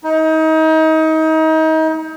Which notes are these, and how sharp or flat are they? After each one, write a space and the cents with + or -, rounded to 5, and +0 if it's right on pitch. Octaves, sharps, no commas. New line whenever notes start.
D#4 +30